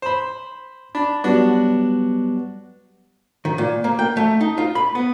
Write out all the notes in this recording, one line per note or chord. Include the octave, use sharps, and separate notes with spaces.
C5 B5
D4 B5
F#3 G3 B3 D4 F#4
D#3
A#2
A#3
G5
A3
D#4
F4
B5
B3